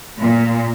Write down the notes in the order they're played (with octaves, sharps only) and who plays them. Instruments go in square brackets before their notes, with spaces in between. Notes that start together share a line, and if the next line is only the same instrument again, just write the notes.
[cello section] A#2